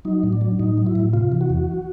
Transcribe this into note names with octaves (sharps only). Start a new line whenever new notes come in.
F#3 D#4
A2
D4
F#3
A2 D#4
F#3
E4
A2
C3 F4
E3
F#4
E2